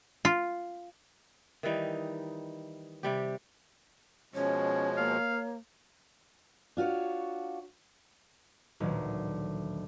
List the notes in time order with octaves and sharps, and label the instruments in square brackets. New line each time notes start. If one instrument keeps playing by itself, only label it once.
[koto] F4
[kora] D#3 E3 G3 D#4
C3 G3 G4
[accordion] B2 F3 G#3 [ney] C#4 [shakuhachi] C#5
[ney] A#3 [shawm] F5
[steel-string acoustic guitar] D4 F4 F#4 C#5
[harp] A1 D2 A#2 D#3 F#3